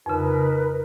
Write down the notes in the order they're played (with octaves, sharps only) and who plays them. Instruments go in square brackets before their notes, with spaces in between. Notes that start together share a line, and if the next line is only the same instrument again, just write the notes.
[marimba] F2 C#3 [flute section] D#4 A#4 B4